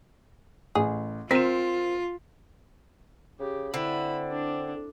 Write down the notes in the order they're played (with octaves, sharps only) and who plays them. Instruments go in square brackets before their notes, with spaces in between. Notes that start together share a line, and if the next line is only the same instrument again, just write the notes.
[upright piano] A1 [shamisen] G#4
[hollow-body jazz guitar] C4 A#4 [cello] F4 [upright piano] B6 E7
[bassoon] C#3 [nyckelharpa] G4
[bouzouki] D3 [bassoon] C4 [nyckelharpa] E4 B5
[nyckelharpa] D4